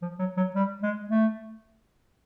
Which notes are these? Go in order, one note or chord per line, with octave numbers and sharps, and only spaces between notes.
F3
F#3
F#3
G3
G#3
A3